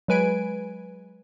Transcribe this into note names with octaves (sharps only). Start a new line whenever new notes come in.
F#3 G#3 B4 G#5 D7